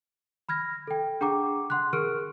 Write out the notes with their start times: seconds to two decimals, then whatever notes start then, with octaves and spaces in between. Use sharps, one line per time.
0.49 B5 F6 G#6 A#6
0.87 A4 G5
1.21 D4 G#4 F#5 G5 A#5 D6
1.70 F#5 C6 F#6
1.93 G#4 A#4 C#6 F6 D7